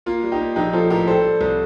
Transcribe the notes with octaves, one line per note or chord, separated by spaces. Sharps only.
A#3 F4
G3
D#4 G4
A#3
A#1 D#4 G4
F3 F4 A4
A2 G4 A#4
G3 A4 C5
G3
C2